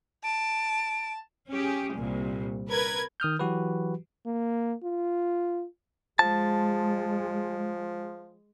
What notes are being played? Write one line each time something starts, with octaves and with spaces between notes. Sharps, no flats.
A5 D7
C#4 G4 G#4
C2 A#2
A#4 B4 G#6
D#3 D#6 F6 G6
E3 F#3 F#4 G4 B4
A#3
F4
F3 G#3 A5